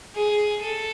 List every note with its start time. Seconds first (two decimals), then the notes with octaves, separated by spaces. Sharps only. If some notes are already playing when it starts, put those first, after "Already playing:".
0.15 G#4
0.61 A4